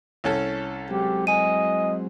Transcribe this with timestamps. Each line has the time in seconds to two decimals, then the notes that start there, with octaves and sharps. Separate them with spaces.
0.24 C2 C#4 A4
0.90 F#3 G#3 C4 G4
1.27 D#5 G#5 D#7